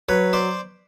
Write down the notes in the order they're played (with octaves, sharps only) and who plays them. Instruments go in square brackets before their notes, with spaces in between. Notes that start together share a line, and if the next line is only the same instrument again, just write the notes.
[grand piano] F#3 [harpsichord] B4 C#5
[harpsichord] C5 D5